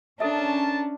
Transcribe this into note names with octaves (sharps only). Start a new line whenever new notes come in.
C#4 D4 A4 A#4 E5 A5